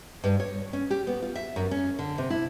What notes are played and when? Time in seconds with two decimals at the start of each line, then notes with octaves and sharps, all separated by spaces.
0.24 G2
0.40 C#5
0.73 C#4
0.90 G4
1.07 B3
1.22 F4
1.36 E5
1.56 F#2
1.71 C#4
1.99 D3
2.18 C3
2.30 E4